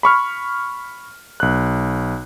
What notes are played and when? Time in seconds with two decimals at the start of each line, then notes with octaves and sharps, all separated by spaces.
0.03 B5 C#6 F6
1.40 B1 F#6